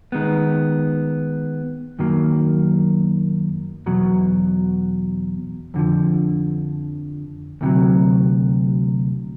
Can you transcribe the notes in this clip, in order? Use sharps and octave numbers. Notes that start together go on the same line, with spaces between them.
D#3 G#3 B3
F#2 D#3 F#3 A#3
E2 B2 F#3
F2 D3 F3
D2 C3 D#3 F#3